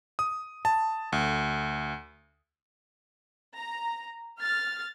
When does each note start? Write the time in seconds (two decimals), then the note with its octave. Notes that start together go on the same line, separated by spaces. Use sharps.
0.19 D#6
0.65 A5
1.12 D2
3.56 A#5
4.39 F6 A6